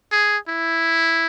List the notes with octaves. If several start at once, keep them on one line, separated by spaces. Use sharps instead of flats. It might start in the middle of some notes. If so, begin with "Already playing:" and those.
G#4
E4